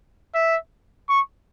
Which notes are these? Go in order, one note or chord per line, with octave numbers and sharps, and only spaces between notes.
E5
C#6